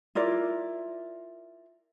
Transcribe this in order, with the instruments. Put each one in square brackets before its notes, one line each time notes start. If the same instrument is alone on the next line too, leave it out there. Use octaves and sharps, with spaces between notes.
[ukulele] E4 F4 A#4 D5